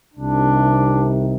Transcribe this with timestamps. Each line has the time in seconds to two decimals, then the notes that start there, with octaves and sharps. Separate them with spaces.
0.14 C2 C3 D#3 D4